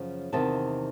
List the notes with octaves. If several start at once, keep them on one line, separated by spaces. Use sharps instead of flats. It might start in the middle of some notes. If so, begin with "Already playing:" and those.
Already playing: F#2 C#3 F3
E2 C3 D#3 A5